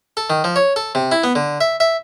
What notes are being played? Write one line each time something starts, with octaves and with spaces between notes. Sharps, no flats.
A4
D#3
F3
C#5
A4
C3
E4
B3
D3
E5
E5